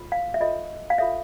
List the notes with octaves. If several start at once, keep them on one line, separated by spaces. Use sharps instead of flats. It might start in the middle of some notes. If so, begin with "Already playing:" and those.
Already playing: F4 A4 C#5
F5
E5
F4 A4 C#5 D#5
F5
F4 A4 C#5 E5